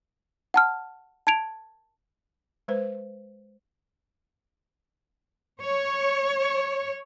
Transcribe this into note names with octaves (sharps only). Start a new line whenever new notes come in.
F#5 A5 F6
A5 G#6 D7 F7
G#3 B4 C5
C#5